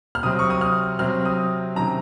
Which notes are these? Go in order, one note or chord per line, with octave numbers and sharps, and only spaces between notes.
F6
C3 F#3 C4 D#6
C#6
D#6
F6
C3 F#3 C4 F6
D#6
C3 D#3 F#3 C#4 A#5